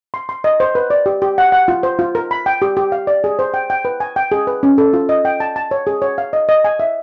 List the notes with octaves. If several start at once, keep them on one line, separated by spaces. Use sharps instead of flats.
C6
C6
D#5
C5
B4
D5
G4
G4
F#5
F#5
F4
C5
F4
A#4
B5
G5
G4
G4
F5
D5
G#4
C5
G5
G5
B4
G#5
G5
G#4
B4
C#4
A4
F4
D#5
G5
A5
A5
C#5
G#4
C#5
F5
D#5
D#5
G#5
E5